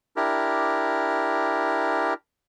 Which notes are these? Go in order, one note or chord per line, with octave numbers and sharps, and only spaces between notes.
D4 E4 G4 A#4